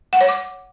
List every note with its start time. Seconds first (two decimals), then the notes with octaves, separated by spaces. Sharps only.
0.13 F#5
0.21 C#5
0.29 D6